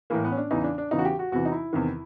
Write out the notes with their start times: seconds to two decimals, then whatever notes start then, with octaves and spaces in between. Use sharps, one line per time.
0.10 A2 E3 A#3
0.24 B3
0.32 C#4
0.37 D4
0.51 E2 C#3 E3 D#4
0.64 D4
0.78 D4
0.91 E2 C#3 E3 D#4
0.98 F#4
1.05 G4
1.19 F#4
1.32 E2 C3 E3 F#4
1.45 D#4
1.52 E4
1.73 E2 C3 D#3